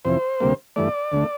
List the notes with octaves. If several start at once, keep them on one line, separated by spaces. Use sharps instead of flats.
F2 C3 E3 C5
D2 C3 G3 A#3
G2 E3 A3 D5
D2 D3 A3